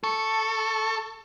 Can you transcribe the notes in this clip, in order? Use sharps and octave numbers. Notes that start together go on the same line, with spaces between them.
A4 C#6